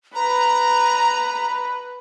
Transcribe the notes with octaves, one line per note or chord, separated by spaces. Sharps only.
B4 A#5